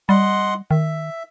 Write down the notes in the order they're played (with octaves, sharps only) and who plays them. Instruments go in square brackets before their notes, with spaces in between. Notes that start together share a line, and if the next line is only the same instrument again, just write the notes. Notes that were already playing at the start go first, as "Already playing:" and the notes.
[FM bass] G3 [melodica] D#5 F#5 C6
[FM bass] D#3 [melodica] E5